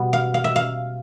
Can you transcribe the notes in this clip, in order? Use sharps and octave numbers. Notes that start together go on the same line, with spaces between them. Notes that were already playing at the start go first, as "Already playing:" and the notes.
Already playing: B2 G3 B3
F5
F5
E5
F5